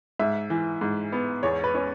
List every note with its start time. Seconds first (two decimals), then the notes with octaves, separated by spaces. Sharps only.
0.19 G#2 E5
0.50 E3
0.81 G#2
1.12 B3
1.43 E2 C#5
1.64 B4
1.74 C#4